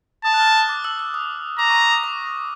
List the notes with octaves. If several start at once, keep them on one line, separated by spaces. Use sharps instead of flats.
A5 D#6
F#6
F6
D6
E6
E6
D#6
A#5 D6
C#6
D6
D#6
D6